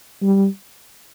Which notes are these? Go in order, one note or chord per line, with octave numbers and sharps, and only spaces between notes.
G3